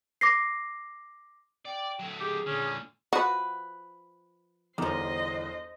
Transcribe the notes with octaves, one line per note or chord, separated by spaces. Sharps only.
D6 A#6 C7
D5 G5
F#3 A3
G4 G#4
A#2 D3 C#4
F3 F#4 B4
G1 E2 D#3 F3 C5 D#5 D6